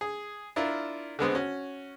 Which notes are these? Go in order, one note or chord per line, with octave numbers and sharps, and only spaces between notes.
G#4
D4 E4 F4 A#4
D3 G#3 B3 C4
C#4 F#4